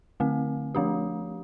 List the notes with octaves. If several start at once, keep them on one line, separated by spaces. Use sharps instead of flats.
D3 A3 C4
F3 A3 D4 G4